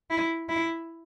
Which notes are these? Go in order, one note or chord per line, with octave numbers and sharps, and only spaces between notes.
E4
E4